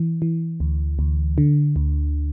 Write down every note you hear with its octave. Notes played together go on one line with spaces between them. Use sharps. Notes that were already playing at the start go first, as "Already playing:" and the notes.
Already playing: E3
E3
D2
D2
D3
D2